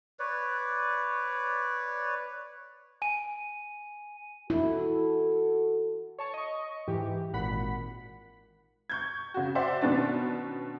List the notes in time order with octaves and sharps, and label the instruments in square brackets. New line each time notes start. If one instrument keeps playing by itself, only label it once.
[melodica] B4 C#5 D5
[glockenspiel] G#5 D#7
[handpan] E4 [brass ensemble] F#4 A4
[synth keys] C#5 A5 C#6
D#5 C#6
G#2 E3 G4
G#1 A#2 F#5 B5 B6
[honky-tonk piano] C#6 G6 G#6
C#3 F#4
C5 D5 E5 F#5 C6
B2 D#3 B3 C#4 D4 A6